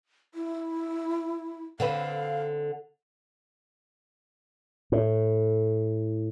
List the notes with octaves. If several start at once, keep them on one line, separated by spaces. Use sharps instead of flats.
E4
D3 C4 B4 F5
A2